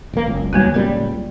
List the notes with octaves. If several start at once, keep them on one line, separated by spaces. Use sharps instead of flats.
E1 A#3
F#1 C#2
D#2 B2 F#3 G3 A#3 B3
D1 C#2 G3 A#4